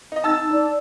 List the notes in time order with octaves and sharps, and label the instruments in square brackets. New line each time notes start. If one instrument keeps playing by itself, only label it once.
[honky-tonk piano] D#4 D#5
[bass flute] D#4 [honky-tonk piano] A5 E6 A6
[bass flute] D5